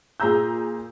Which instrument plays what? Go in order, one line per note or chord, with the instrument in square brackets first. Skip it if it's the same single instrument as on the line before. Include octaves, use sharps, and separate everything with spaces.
[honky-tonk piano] A#2 G#4 A#5 E6 G6